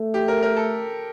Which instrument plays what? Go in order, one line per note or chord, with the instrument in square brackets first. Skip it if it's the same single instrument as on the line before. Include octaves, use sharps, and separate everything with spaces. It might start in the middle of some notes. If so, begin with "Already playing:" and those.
Already playing: [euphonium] A3
[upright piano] G4
A#4
A#4
A4